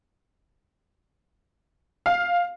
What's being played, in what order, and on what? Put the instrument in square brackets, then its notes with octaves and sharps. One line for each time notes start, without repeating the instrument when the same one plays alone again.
[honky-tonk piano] F5